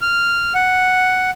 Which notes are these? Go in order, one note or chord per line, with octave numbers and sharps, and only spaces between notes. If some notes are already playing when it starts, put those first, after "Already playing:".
F6
F#5